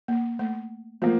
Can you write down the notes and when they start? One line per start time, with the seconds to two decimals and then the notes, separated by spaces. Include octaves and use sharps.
0.08 A#3
0.39 A3
1.02 F3 A3 A#3